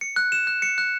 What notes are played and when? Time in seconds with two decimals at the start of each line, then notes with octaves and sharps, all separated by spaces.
0.01 C#7
0.16 F#6
0.32 E7
0.47 F#6
0.62 C#7
0.78 F#6